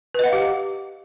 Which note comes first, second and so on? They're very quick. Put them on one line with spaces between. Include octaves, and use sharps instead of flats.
B4 D#5 F#5 F5 G4